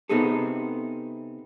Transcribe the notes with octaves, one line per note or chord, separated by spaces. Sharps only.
C3 B3 C4 D#4 G#4 A4